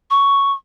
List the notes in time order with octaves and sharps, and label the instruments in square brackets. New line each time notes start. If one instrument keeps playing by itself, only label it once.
[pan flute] C#6